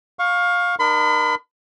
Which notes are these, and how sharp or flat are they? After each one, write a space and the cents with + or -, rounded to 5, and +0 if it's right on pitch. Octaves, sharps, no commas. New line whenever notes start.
F5 +20 C#6 +0
D#4 -40 A#4 +20 B5 +40